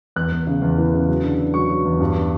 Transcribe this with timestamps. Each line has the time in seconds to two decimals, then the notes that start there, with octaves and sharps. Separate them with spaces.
0.16 E2 F#6
0.32 E2
0.47 C#3
0.62 E2
0.78 E3
0.94 C#3
1.08 F#3
1.24 D3
1.40 D3
1.54 F#3 C#6
1.70 F#3
1.85 E2
2.00 G2